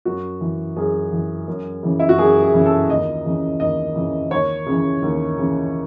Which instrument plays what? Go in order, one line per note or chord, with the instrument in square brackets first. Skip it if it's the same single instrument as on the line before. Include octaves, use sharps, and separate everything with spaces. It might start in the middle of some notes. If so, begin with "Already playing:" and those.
[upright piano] F#2 F#4
E3
F#2 G#4
E3
F#2
C#3 E3
E4
F#4
F#2 G#4
G#4
C#3 E3
A4
D#2 D#5
C#3 E3
D#2 D#5
C#3 E3
D#2 C#5
C#3
E3
D#2
C#3 E3